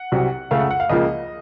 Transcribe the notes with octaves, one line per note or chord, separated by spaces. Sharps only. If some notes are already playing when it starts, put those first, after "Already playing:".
Already playing: F#5
C2 C3 F#3
C#2 C#3 A3 F5
F#5
F#5
F5
C#2 C#3 F3 A#3 D#5